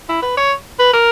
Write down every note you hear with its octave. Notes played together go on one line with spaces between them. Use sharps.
E4
B4
C#5
B4
A#4